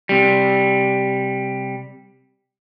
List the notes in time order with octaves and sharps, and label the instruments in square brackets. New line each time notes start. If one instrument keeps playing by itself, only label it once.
[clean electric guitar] C3 G3